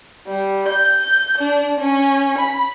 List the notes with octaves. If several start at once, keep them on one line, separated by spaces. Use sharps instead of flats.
G3
G6
D4
C#4
B5